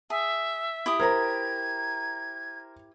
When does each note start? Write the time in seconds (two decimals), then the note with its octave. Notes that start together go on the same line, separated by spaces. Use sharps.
0.10 G#4 E5
0.86 E4 G4 D#6
0.99 A#4 C5 A#5 G#6